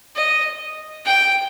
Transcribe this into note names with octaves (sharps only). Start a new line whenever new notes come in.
D#5
G5